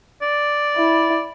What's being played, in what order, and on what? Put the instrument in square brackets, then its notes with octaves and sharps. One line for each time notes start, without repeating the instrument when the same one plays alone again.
[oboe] D5
[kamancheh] E4